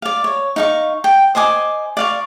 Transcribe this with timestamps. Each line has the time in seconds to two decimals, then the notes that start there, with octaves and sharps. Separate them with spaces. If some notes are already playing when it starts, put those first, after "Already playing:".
0.02 D5 F5
0.24 C#5
0.56 D#4 F5 C#6
1.04 G5
1.35 C5 D#5 G#5 D6
1.97 D5 F5 C#6